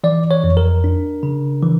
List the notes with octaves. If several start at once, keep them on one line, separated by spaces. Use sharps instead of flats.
E3 D5
C#5
F2
A#4
D4
C#3
E3